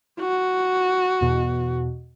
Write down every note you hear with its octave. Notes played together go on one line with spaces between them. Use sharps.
F#4
E2 B2